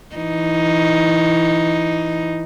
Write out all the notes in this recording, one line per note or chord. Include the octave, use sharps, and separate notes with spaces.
E3 D#4